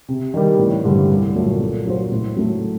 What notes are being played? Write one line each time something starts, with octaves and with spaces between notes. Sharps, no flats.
C3
D#3 G3
A1
G2 D3 G3
C2
A#2 F#3 A3
A#2
F#3 A#3 F#4 C5
A2
F#3 A3